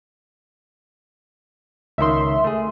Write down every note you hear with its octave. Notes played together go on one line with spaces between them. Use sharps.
C#2 D#3 E5 C6
A3 G#4